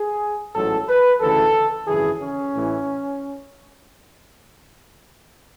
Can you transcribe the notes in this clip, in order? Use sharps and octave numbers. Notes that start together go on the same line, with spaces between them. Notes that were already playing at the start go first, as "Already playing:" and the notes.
Already playing: G#4
A1 G#2 F#3 A4
B4
D2 C#3 E3 A4
G#1 F#2 C#3 E3 G#4
C#4
A1 A2 E3